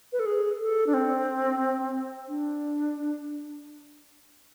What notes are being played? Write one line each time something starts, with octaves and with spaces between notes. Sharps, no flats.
B4
A4
G#4
A4
D4
C4
D4